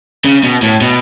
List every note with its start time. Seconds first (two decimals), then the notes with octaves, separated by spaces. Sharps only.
0.24 C#3
0.43 B2
0.62 A2
0.81 B2